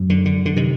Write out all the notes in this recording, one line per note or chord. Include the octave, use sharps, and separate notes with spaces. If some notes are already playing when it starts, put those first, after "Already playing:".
Already playing: F#2
D3
D3
D3
C3 D#3